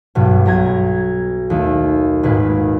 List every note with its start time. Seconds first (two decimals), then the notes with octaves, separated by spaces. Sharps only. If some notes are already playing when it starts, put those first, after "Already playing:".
0.15 B1 G2 B2
0.46 B1 A#5 G#6
1.50 D#2 A3
2.23 G#1 A#2 B4